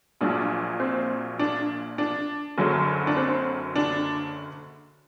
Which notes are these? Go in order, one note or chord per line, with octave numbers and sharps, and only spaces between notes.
A#1 A#2 F#3 D4
C4
D4
D4
F#1 F#2 D3 F#3
D4
C4
D4